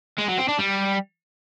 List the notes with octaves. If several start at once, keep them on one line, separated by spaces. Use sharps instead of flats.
G#3
F#3
C4
D4
G3